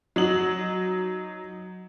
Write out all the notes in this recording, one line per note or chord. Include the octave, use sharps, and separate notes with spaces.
F#3 D#4 F#7